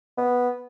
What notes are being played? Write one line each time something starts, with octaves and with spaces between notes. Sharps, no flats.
B3